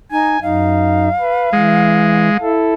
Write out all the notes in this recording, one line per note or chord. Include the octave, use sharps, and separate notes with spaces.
D#4 G#5
F#2 D#4 F5
B4
E3 G#3
E4 A4